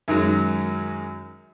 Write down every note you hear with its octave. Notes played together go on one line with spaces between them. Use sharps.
F#2 D#3 F#3 G#3